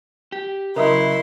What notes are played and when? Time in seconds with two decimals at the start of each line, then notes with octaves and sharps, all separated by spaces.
0.32 G4
0.76 C#3 F#3 E4 A#4 D#5 E5 C6